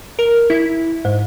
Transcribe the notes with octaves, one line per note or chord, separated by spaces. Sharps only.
A#4
E4
G#2